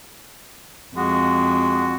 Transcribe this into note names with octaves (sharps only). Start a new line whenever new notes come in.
F2 G#3 F#4